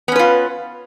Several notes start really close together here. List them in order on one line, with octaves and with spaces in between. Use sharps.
B3 C#4 B4 F4